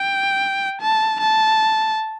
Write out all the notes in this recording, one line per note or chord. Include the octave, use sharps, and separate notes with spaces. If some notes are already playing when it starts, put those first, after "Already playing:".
Already playing: G5
A5
A5